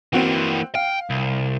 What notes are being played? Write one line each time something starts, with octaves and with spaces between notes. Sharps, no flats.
E3 A#3 C4 F#4 G5
F5 G5
C2